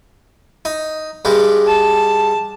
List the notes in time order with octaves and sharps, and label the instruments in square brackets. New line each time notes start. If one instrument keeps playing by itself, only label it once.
[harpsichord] D#4
G2 G3 G#3
[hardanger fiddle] A5